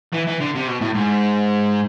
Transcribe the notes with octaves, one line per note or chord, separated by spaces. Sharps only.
E3
E3
D3
C3
B2
A2
G#2